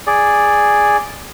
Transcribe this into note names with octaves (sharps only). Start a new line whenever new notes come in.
G#4 D5